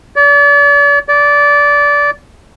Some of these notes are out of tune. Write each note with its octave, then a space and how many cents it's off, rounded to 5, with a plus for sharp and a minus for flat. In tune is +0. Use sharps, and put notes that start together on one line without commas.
D5 -40
D5 -20